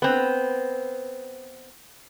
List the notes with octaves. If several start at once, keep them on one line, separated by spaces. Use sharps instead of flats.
B3 C4